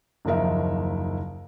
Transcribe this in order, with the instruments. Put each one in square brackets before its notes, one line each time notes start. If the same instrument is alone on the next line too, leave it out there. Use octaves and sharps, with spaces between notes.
[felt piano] F#1 D#2 F3 D#4 A#4 E5